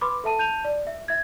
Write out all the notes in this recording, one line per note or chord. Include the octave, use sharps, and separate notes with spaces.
B4 B5 C6 D6
A4 E5 A5 D#7
A5 G6 D#7 F7
D5
E5
E5 G#6